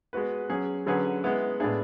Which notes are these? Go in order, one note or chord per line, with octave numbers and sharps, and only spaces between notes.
G#3 B3 F#4 B4
F#3 C#4 G#4
D3 F#3 C#4 G#4 B4
G#3 B3 E4
A2 G#3 B3 D4 G#4